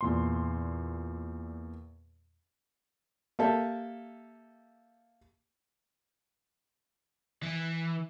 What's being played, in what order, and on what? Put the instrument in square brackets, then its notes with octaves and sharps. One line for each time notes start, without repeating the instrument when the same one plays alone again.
[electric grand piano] E2 A#2 C6
[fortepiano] A#3 G4 A4 E5
[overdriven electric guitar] E3